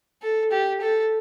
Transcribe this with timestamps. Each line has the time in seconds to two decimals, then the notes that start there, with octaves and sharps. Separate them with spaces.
0.22 A4
0.51 G4
0.81 A4